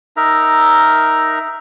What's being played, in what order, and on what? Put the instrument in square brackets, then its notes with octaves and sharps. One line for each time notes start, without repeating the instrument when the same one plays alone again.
[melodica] D#4 A#4 E5 A#5